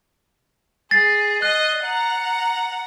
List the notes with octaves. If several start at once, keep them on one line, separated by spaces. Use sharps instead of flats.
G#4 A6 C7
D#5 F#6
F#5 A#5